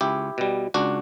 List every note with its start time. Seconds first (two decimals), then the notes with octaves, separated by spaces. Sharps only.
0.01 C#2 E4 G4
0.38 B2 G3
0.74 C#2 D4 F#4